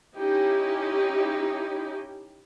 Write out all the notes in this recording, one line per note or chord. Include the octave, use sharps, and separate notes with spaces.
C#4 D#4 E4 G4